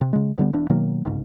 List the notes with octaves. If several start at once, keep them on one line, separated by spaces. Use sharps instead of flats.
C3
C#3 G#3
D1 D3 G3 B3
E1 E2 D4
B2 D#3 F#3 A#3
G1 C2 G#2 C#3